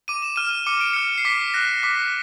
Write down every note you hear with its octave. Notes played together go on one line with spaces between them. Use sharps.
D6 D#7
E7
F6 D#7
D6 C#7
D7
F6 C#7
C7
D6 B6
F#6 A#6
D6 B6